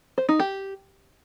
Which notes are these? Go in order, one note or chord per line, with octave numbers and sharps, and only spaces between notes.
C5
D#4
G4